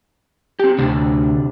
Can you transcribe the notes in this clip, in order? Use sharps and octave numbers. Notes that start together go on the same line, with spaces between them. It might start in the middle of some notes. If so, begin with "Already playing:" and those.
C4 G4
D2 A2 C3 D4